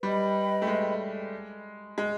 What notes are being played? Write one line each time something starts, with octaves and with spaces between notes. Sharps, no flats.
G3 B4 D#5 G5 B5
A3
G#3
G#3